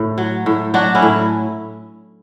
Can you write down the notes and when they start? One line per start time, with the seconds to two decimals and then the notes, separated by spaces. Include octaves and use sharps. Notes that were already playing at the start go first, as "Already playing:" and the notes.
Already playing: A2
0.18 F#3
0.46 A2
0.74 F#3 D4 F#4
0.95 C#4 E4
1.02 A2